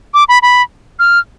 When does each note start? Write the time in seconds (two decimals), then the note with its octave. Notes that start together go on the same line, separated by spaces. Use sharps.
0.14 D6
0.29 B5
0.42 B5
0.99 F6